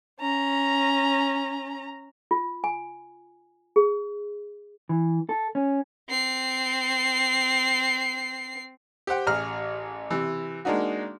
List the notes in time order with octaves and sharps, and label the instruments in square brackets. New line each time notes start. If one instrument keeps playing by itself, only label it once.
[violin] C#4 A#5
[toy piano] F4
G#5
G#4
[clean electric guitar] E3
A4
C#4
[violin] C4 C7
[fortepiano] G4 C5 F#5 G5
A1 G#4 A#5 F6
C3 E3
G#3 A#3 D4 D#4 F#4